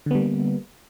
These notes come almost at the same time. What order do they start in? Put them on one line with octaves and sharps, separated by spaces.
D3 B3 G3 A#3